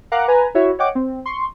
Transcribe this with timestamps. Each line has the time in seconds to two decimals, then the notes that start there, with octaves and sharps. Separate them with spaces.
0.12 A#4 F5 F#5 A#5 D6 F#6
0.28 B4 G#5 A#5
0.55 E4 F#4 C#5 E5
0.79 C#5 D#5 F#5 G5 D6
0.95 C4
1.26 C6 C#6